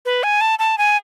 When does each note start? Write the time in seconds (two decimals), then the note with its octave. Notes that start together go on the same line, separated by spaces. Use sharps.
0.05 B4
0.23 G#5
0.41 A5
0.59 A5
0.78 G#5